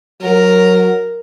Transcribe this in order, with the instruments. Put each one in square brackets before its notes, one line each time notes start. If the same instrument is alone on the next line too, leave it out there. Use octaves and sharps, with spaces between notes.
[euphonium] F#3 [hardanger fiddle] A#4